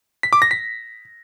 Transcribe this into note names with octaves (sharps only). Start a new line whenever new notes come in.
B6
D6
A#6
B6